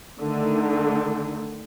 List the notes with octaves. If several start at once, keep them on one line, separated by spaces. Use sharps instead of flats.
D3 D#3 A3